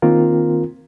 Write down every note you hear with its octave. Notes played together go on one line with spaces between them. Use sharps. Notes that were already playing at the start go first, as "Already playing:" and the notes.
D#3 A#3 C4 F4 A#4